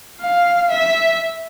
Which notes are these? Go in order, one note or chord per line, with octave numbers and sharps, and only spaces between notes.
F5
E5